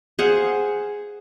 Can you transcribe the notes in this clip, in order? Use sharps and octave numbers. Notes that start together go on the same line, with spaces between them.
G#4 C5 F5 F#5